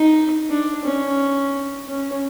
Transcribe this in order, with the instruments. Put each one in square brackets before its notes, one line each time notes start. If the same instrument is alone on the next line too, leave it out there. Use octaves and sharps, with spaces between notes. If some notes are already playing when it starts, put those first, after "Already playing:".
Already playing: [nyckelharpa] D#4
D4
C#4
C#4